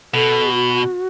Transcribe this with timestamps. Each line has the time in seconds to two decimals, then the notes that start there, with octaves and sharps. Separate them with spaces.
0.14 B2 A4
0.52 F#4